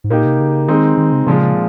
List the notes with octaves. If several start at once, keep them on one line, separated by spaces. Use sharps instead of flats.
G#2
A#2 A#3 D#4 G4
C3
C#3
D#3 G#3 C4 D#4
D#3
C#3
A#2 C#3 F3 G#3